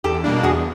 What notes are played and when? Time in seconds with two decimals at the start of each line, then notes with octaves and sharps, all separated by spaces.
0.04 E2 G4 A4
0.24 B2 G3 A#3 D4
0.43 E2 F#4 G#4